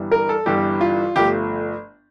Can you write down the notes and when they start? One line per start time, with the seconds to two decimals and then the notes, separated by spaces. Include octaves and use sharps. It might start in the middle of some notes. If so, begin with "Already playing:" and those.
Already playing: G1 G2 E3 G3
0.12 A#4
0.29 A4
0.46 G1 G2 E3 G3 G4
0.81 F4
1.16 G1 F3 A3 G4